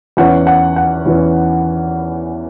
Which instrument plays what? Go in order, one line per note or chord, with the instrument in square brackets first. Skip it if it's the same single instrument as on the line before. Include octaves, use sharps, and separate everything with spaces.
[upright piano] E2 E3 C#4 F#5
F#5
F#5
E2 E3 C#4